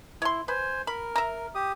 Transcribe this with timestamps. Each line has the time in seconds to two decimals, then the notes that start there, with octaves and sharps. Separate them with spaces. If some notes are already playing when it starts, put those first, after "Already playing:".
0.22 E4 C#5 C6
0.48 B4 C5 G#5
0.87 A#4 B5
1.16 E5 A#5
1.55 G4 D#6